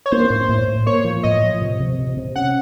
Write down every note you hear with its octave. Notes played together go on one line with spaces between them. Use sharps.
C#5
A#3 C5
A2
A2
A2
A#3 C#5
F3
A2 D#5
F3
C3
C3
C3
C3
C#4 F#5